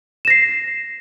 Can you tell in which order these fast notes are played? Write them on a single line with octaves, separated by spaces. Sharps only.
E7 A#6 C7